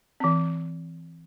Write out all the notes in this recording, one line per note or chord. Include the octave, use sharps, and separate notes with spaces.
E3 C4